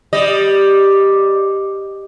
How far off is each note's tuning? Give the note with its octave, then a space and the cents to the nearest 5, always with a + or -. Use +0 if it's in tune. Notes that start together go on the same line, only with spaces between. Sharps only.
G3 +0 D#5 -10